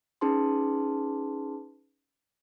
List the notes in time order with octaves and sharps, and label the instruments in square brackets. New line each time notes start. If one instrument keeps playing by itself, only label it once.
[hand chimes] C#4 D#4 G#4 B4 A5 C6